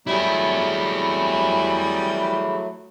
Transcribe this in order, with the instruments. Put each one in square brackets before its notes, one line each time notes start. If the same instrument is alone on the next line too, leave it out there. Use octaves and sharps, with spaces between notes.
[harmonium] F#3 A3 [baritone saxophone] G3 [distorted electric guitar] E4 G#4